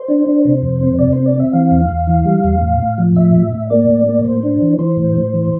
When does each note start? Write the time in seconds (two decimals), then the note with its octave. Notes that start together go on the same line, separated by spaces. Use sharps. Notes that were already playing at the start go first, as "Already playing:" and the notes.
Already playing: C5
0.08 D4
0.26 D4
0.45 C3 C5
0.62 F2
0.81 C4
0.98 C3 D5
1.13 C4 C5
1.26 D5
1.35 C4 E5
1.53 E3 F5
1.71 E2
1.89 E2
2.07 E3
2.25 G3
2.44 E2
2.61 A2
2.80 A2
2.98 F3
3.16 A2 E5
3.35 A2
3.52 A2
3.70 A#3 D5
3.88 A2
4.06 A#3
4.25 A2 C5
4.43 D4
4.61 E3
4.79 E3 C5
4.97 A2
5.15 A2
5.33 E3